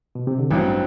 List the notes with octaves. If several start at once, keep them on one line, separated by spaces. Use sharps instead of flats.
B2
C3
D3
A1 G2 E3 F#3 C4